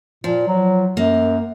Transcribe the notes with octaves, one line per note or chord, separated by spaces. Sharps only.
A#2 F3
F#3
F#2 A#3